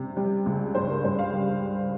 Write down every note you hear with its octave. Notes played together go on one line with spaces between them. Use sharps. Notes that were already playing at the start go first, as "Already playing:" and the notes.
Already playing: C3 G3
G3
C#2
G2 C5
A#4
G2 C5
F5
G3